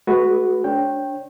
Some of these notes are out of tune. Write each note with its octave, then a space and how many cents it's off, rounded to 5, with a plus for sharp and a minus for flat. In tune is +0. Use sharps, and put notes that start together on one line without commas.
G#3 +45 F#4 +0 B4 +0
D4 -25 C#5 -30 G5 +0